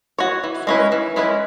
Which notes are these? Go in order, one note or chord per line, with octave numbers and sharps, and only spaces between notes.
F#4 C#5
E3
G#3 C#4 E4 B4
E3
G#3 C#4 E4 B4